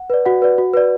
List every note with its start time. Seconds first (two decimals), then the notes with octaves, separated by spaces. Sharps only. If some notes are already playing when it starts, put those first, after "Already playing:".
Already playing: F#5
0.10 B4 D5
0.25 F#4 F#5
0.42 B4 D5
0.58 F#4
0.73 B4 D5